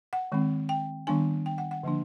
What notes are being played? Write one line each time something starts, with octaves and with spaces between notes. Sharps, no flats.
F#5
D#3 G#3 C4
G5
D#3 G3 B3 D4 G#5
G5
F#5
F#5
D3 F3 A#3 D4